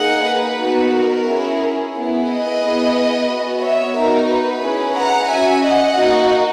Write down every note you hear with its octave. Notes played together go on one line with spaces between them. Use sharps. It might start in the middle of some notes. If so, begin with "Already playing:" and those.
Already playing: A#3 D#4 G#4 D#5 F#5
B4
B3 D#4 F#4
A#4
C#4 E4 G#4
B3 E4 G#4
B4 D#5
B3 E4 G#4
B3 F#4
C#5 E5
B3 D#4 F#4 A#4
B4
C#4 E4 G#4
F#5 A#5
C#4 F#4 E5 G#5
D#5 F#5
A#3 D#4 F#4